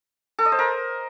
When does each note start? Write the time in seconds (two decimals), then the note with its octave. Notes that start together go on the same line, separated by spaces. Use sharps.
0.39 A4
0.45 D#5
0.52 C5
0.59 A#4